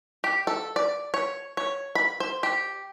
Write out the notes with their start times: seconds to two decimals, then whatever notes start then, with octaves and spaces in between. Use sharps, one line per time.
0.24 G4
0.47 A4
0.76 D5
1.14 C#5
1.57 C#5
1.95 B5
2.20 C5
2.43 G4